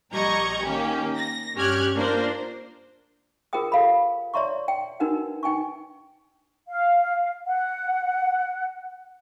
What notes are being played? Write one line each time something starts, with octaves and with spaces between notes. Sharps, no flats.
A#1 G3 D#5 A#5 C#6 G#6
D#3 A#3 C#4 G4
A#6
G2 C#4 G4 F6 F#6 G#6
A#3 D4 F4 A#4 C5
F4 G#4 A#4 C5 G5 D#6
G4 A4 C#5 F5 G5 B5
C#5 D5 E5 A#5 C6 C#6
G5
D4 D#4 F#4 A#4 B4 F#5
D#4 G5 G#5 C#6
F5
F#5